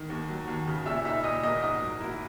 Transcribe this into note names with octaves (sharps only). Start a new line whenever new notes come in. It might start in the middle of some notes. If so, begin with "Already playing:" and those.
Already playing: D#3
D#2
F#3
D#2
C#3
A#2 E5 E6
D#4 E5 E6
A#2 D#5 D#6
A#3 D#5 D#6
G#2 D#5 D#6
F#3
A#3 E4 E5